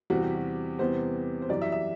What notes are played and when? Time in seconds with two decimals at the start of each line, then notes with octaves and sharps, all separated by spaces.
0.10 E2 C3 G3 F#4
0.22 G4
0.35 F#4
0.79 E2 C3 G3 B3 C5
1.42 C5
1.49 F#2 E3 G3 D5
1.62 E5
1.72 E5